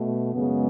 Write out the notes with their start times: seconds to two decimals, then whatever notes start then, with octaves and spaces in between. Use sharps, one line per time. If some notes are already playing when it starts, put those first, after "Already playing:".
Already playing: B2 A3
0.34 F#2 C#3 G#3 B3